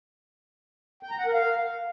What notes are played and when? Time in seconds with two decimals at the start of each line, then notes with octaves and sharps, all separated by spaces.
1.03 G5
1.11 A#5
1.18 F#5
1.26 A#4
1.34 F5